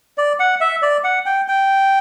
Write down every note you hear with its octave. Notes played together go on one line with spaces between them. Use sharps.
D5
F#5
E5
D5
F#5
G5
G5